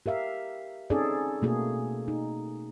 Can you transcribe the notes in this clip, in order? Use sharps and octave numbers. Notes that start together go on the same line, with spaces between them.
G4 A#4 E5 F5
C4 C#4 D#4 G#4 A4 D5
B2 A3 A#3 F#4 G#4 A4
D#4